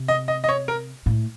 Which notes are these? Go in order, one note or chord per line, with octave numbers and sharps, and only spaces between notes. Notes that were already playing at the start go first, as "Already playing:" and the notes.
Already playing: C3
D#5
D#5
D#5
C#5
A#4
A2